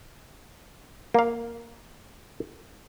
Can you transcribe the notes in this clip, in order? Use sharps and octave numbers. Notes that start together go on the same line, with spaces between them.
A#3 F5